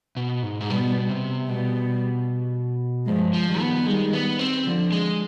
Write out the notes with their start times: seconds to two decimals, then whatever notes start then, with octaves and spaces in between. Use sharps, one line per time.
0.16 B2
0.43 G#2
0.61 G#2
0.69 B2 G3 B3
1.09 C3
1.48 B2 G3 B3
3.07 G2 F3 G#3
3.33 F3
3.47 D#3 G3
3.60 B3
3.86 D#3 G3 G#3
4.13 B3
4.39 C4
4.66 D3 F3
4.92 G#3